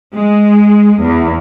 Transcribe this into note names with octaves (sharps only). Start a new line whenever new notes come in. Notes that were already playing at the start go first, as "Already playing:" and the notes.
G#3
E2